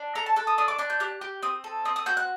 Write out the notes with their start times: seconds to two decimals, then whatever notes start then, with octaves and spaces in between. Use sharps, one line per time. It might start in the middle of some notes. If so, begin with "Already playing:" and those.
Already playing: D4
0.15 A4 A#5
0.26 A5
0.36 A4 F#6
0.47 D#6
0.58 D4 D#6
0.68 D6
0.79 D4 F#6
0.90 G6
1.00 G4 F#6
1.21 G4
1.43 C4 D#6
1.64 A4
1.85 C4 D#6
1.96 D#6
2.06 F#4 G6
2.17 F#6